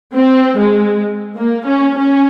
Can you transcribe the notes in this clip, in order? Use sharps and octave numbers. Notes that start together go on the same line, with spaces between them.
C4
G#3
A#3
C#4
C#4